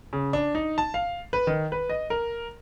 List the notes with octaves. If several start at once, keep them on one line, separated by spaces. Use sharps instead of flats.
C#3
D4
D#4
A5
F5
B4
D#3
B4
D#5
A#4